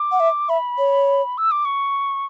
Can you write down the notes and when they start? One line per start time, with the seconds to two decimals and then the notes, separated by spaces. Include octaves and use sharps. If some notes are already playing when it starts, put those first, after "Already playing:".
Already playing: D6
0.12 F#5
0.20 E5
0.49 E5 B5
0.78 C#5
1.38 E6
1.51 D6
1.65 C#6